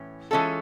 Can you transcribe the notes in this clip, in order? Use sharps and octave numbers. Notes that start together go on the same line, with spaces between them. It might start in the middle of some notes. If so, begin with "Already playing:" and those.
Already playing: A2 E3 C#4
E3 G#3 C#4 F4 A4